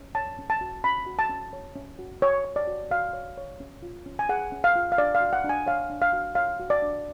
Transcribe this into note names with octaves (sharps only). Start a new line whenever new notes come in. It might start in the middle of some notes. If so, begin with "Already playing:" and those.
Already playing: C#4
C#5 A5
C#4
A5
F#4
C#4 B5
F#4
A5
C#4
C#5
C#4
F#4
C#5
C#5
D5
F#4
F#4 F5
C#5
C#5
C#4
F4
C#4
G#5
G#4 F#5
C#4
F5
F4
F5
D4 D5
F5
F#4
F#5
D4 G#5
C#5 F5
D4
F5
F#4
C#5 F5
F#4
D5
D4